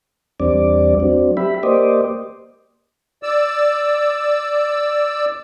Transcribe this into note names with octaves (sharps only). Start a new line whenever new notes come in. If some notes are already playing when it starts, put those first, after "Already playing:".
E2 G3 C4 D4 D5
F#3 C4 D4
G4 E5 B5
A#3 G4 C5 D5 D#5
D5 E6